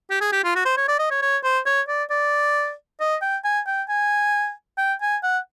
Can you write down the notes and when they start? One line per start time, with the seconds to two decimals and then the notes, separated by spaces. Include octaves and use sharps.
0.10 G4
0.21 G#4
0.32 G4
0.44 F4
0.55 F#4
0.65 C5
0.77 C#5
0.88 D5
0.99 D#5
1.11 C#5
1.22 C#5
1.44 C5
1.66 C#5
1.88 D5
2.10 D5
3.00 D#5
3.22 G5
3.44 G#5
3.67 G5
3.89 G#5
4.78 G5
5.01 G#5
5.23 F#5